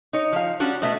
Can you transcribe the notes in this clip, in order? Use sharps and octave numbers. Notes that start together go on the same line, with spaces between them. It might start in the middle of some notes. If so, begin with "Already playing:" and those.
D#4 C#5
F3 F5
G3 C#4 D4 F#4
B2 A3 E5